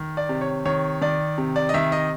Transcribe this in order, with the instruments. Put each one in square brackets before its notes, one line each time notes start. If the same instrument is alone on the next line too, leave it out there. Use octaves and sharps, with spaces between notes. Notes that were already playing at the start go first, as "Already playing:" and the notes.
Already playing: [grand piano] D#3
D5
C3
C#5
D#3 C#5
D#3 D5
C3
D5
D#5
D#3 E5
D#5